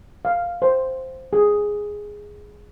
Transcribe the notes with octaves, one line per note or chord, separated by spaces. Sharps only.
F5
C5
G#4